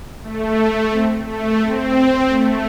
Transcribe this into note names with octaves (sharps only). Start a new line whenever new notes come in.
A3
C4
A3
C4
A3